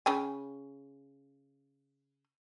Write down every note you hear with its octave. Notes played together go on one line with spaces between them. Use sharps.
C#3 G5 G#5